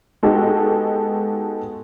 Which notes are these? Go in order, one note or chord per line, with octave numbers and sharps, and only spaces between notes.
G#3 B3 D#4 F#4 G4 A4